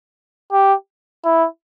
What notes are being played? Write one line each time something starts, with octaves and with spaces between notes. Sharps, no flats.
G4
E4